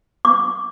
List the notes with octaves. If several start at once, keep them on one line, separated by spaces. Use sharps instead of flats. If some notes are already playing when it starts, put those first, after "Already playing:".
D6